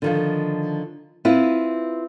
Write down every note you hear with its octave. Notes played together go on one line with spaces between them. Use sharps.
D3 D#3 F3
C4 E4 F4 B4